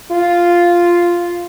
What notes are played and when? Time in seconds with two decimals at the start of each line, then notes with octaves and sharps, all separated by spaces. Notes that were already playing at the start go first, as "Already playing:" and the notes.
0.11 F4